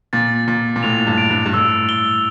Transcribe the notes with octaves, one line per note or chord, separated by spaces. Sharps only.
A#2 A6
A#2 A6
A#2
A2 F7
G2
D7
G2
G2
A2 E6
G7